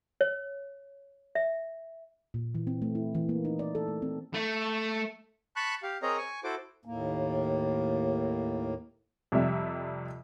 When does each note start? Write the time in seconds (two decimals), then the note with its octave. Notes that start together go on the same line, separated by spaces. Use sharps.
0.21 C#5
1.35 E5
2.34 A#2
2.55 E3
2.67 C4
2.82 A3
2.95 E4
3.15 E3
3.29 A#3
3.45 D#4
3.59 D5
3.75 A4
3.88 A3
4.02 C4
4.34 A3
5.56 A5 B5 C#6 F#6
5.83 G4 F5
6.02 C4 G#4 A#4 C#5 D#5 A#5
6.17 G#5 C#6
6.44 E4 F#4 A4 C5 D6
6.85 D#2 A2 A#3
9.32 F2 C3 G3 E5